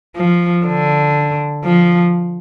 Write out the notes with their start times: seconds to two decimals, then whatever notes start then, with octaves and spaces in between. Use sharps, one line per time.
0.17 F3
0.67 D3
1.65 F3